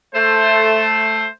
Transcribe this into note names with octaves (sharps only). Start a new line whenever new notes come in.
A3 C5